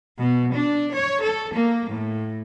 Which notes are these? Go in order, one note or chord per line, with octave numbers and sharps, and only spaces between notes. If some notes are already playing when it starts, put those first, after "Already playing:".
B2
D4
C#5
A4
A#3
A2